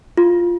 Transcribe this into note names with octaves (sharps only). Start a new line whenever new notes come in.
F4